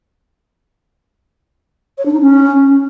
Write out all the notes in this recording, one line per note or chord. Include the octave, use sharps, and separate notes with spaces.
C#5
D4
D#4
C#4